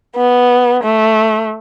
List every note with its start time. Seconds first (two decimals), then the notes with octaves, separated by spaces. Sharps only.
0.16 B3
0.83 A3